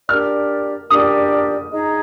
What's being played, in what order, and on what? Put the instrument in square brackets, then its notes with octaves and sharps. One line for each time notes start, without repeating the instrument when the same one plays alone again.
[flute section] D4 G4 A#4 D5 [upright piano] F6
[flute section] D4 G4 A#4 D5 [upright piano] D#6
[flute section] D#4 G#4 D#5 A#5